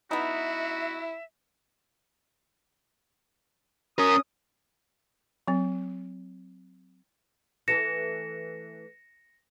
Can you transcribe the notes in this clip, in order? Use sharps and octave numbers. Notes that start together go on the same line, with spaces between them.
B3 D#4 E4 F#4 E5
C#4 A#4 D#6
F#3 C4
E3 A3 E4 A#6 C#7 E7